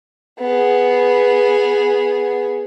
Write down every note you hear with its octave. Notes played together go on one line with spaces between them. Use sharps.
B3 G#4